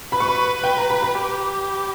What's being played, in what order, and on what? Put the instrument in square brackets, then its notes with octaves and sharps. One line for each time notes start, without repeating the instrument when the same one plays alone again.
[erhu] B4 [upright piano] B5
[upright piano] C#6
B5
G5
A#5
B5
B5
[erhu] G4